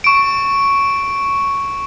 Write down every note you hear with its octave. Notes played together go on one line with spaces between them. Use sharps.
C#6 D7